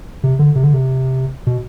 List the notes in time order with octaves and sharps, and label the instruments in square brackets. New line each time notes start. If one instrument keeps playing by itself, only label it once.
[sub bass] C3
D3
C3
D3
C3
B2